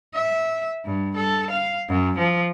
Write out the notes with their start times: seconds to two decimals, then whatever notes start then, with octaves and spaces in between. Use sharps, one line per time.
0.14 E5
0.85 G2
1.16 A4
1.50 F5
1.89 F#2
2.18 F3